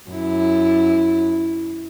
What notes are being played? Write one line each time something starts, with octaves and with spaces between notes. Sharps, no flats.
F#2 E4